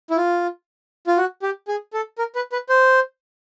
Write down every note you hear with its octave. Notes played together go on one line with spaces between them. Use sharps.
E4
F4
F4
F#4
G4
G#4
A4
A#4
B4
B4
C5